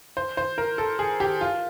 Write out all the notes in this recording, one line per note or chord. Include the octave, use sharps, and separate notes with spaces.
C5
C5
A#4
A4
G#4
G4
F4